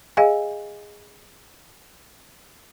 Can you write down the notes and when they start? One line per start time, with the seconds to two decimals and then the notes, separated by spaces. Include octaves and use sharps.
0.17 G#4 D#5 F5 G#5